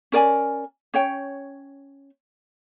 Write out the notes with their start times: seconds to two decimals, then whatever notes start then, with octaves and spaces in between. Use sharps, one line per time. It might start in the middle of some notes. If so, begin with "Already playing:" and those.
0.12 C#4 A#4 D5 G#5
0.94 C#4 C#5 G5